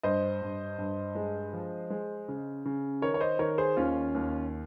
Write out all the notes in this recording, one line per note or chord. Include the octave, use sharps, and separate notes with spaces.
G2 C5 D#5
G2
G2
G#3
F3
G#3
C#3
C#3
D#3 A#4 C#5
C#5
C5 D#5
D#3 A#4 C#5
G#4 C5
D#2 C#4 F4
D#2